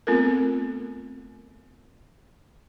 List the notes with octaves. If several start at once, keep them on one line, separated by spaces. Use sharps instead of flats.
A3 B3 C4 F4 A4 A#4